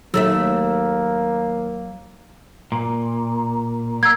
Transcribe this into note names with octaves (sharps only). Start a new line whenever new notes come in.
D#2 F#3 A3 A#3 E5 E6
A#2
A#3 E6 G#6